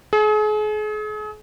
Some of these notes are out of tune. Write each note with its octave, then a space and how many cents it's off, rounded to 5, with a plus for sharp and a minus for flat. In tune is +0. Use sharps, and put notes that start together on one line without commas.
G#4 +40